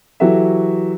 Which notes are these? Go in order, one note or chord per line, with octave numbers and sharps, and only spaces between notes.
E3 F#3 F#4 G4 A4 E5